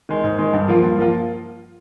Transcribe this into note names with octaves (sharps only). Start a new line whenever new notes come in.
D#3 G#3
G#2
D#3 G#3
G2
F3 A#3 F4
G2
F3 A#3 F4